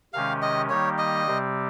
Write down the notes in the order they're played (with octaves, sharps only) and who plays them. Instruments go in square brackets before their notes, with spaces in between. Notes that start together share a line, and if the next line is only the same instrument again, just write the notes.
[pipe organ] C3 D#3 G#3 C#4 G4 [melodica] F5
[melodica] D#5
[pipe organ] D#3 G3 A#3 D#4 G4 [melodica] C#5
[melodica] D#5
[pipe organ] C3 G3 C4 G4